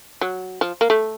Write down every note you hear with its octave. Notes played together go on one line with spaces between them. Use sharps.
F#3
F3
A#3
A3